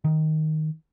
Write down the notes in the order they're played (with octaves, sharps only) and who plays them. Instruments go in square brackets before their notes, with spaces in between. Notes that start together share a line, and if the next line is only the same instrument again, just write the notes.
[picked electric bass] D#3